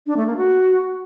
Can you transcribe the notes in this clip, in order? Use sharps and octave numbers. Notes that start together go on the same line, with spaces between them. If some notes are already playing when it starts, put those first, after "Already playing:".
D4
A3
A#3
F#4